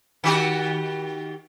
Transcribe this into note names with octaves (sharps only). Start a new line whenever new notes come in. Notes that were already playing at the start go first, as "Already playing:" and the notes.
D#3 F#4 G4